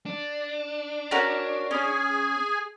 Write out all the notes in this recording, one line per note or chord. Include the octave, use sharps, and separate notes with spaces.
D4
C#4 F#4 A#4
C#4 G#4 G#5